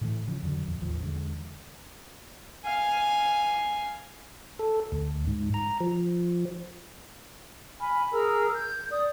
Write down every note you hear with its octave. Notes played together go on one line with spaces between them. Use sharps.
A2 D#3 E3 A3
C#3 F3 C#4
F2 D3 F#3
D#1 F2
A1 D#2 F3
E2 D3 G#3
F5 G#5
A4
D2
G#2
A#5
F3
G#5 B5 F6
G#4 A#4 A#5 E6
G6
D5 D#6